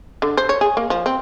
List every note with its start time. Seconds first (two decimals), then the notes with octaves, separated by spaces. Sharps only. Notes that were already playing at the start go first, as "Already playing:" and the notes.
0.22 D3
0.37 C5
0.49 C#5
0.61 G#4
0.77 A#3
0.90 F3
1.06 C4